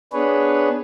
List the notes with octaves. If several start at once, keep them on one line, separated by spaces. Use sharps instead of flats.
B3 D4 G#4 B4 C#5